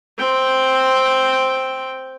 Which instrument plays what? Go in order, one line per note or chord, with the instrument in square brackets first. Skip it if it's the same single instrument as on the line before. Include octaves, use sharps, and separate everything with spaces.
[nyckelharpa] C4 G5